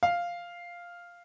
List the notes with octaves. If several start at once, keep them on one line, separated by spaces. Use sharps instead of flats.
F5